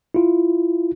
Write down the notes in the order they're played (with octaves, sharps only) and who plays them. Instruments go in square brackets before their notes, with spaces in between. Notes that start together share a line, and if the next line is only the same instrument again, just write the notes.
[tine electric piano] E4 F4